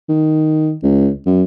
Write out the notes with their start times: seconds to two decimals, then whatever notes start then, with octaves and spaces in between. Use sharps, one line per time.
0.09 D#3
0.83 C#2
1.26 F#2